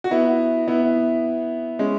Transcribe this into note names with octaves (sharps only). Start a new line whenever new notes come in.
F#4
B3 E4
B3 E4
G#3 C#4